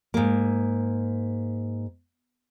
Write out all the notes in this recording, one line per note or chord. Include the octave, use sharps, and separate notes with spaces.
G#2 A#3